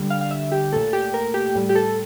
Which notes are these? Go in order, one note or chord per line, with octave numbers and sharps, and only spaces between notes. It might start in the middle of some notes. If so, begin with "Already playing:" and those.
Already playing: D3 G3
F5
F5
E5
G4
A#2 A3 A4
G4
A#4
G4
A2 G3
G4
A4